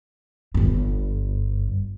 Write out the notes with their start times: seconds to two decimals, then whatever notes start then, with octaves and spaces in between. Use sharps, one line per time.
0.54 G1 G2